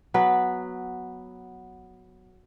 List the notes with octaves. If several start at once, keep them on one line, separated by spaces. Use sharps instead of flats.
F#3 B3 B4